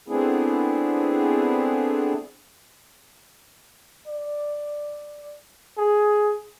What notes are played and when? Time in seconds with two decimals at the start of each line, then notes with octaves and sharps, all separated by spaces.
0.08 A3 B3 C4 D4 E4 G#4
4.08 D5
5.78 G#4